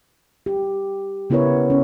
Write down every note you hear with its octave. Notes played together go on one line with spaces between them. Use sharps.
G4
C#3 B3 E4 A#4 B4 C#5
C#4